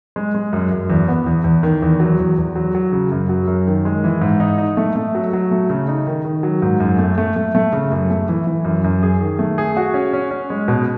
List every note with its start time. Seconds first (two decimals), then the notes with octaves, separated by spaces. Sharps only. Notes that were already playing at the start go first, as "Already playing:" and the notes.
0.16 G#3
0.34 G#3
0.53 F#2
0.71 F#2
0.90 E2
1.08 B3
1.27 E2
1.44 E2
1.63 D#3
1.82 E2
2.00 F#3
2.19 E2
2.38 E2
2.56 F#3
2.75 F#3
2.92 C#3
3.12 F#2
3.29 F#3
3.47 F#2
3.67 D#3
3.85 G#3
4.04 E3
4.21 G#2
4.40 D#4
4.58 D#4
4.77 A3
4.96 A3
5.15 F#3
5.33 F#3
5.51 A3
5.70 C#3
5.88 D#4
6.07 D#3
6.25 D#3
6.43 F#3
6.62 G#2
6.80 F#2
6.99 A3
7.18 A3
7.36 A3
7.55 A3
7.73 C#3
7.92 F#2
8.10 A3
8.29 E3
8.47 E3
8.65 F#2
8.84 F#2
9.03 G#4
9.21 D#3
9.39 A3
9.58 G#4
9.77 F#4
9.94 C#4
10.13 C#4
10.31 C#4
10.50 G#3
10.68 B2